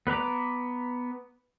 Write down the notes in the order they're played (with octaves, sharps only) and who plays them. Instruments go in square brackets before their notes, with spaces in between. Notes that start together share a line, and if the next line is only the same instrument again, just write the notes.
[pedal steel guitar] B3 B4 A#5 D6